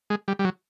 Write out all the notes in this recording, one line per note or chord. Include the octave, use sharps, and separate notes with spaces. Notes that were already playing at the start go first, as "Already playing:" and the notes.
G#3
G3
G3
F#3